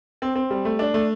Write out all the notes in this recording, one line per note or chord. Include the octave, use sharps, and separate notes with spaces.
C4
C4
G3
A3
D4
A3